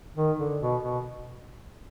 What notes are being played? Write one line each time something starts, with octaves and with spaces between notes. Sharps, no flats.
D#3
D3
B2
B2